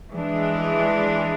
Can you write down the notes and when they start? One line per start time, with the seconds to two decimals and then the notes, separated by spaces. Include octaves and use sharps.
0.12 E3 G#3 D4